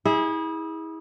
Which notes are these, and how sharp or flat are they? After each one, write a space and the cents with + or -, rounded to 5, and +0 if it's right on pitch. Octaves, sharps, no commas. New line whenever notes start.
E4 -35 G#4 -20